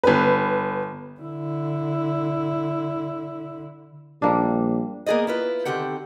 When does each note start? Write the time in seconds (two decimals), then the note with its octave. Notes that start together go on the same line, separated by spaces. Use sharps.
0.04 G1 B4
1.20 D3 E4
4.22 A#1 G3 A#3 D4
5.06 A#3 B3 G#4 D5 D#5
5.27 E4 F4 B4
5.65 D3 D#3 C4 G4 F#5